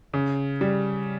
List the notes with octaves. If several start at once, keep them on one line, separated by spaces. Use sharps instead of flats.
C#3
G3